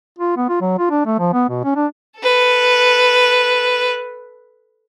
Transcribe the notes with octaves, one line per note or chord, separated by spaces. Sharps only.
F4
B3
F4
F#3
F4
D4
A3
F3
B3
B2
C#4
D4
A4 B4